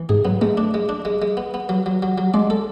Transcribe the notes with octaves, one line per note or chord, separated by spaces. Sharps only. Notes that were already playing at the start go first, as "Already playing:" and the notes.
Already playing: E3
G#2 G#4
F#3 B3
G#3 A3
D4
G#3
D4
G#3
G#3
B3
B3
F#3
F#3
F#3
F#3
G#3 D5
A4